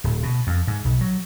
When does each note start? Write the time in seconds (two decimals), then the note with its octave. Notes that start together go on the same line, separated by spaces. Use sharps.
0.04 D1
0.23 B2
0.47 F2
0.67 G#2
0.85 B1
1.01 F#3